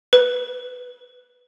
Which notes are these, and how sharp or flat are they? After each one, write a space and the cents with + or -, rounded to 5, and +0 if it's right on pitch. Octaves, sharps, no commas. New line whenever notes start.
B4 +0